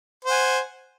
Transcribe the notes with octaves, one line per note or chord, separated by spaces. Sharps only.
C5 F#5 G#5